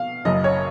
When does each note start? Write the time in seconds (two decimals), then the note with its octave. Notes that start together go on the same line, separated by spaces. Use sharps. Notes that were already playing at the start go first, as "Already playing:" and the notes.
Already playing: B2 F5
0.25 F#1 F#2 C#3 D#5
0.44 C#5